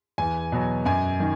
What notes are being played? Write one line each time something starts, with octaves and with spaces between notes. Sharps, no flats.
E2 G#5
B2 F#3
F#2 G#5
D#3